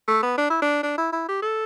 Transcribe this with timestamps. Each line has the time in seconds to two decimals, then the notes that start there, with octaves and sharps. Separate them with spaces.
0.08 A3
0.23 B3
0.38 D4
0.50 E4
0.62 D4
0.83 D4
0.98 E4
1.13 E4
1.29 G4
1.42 A4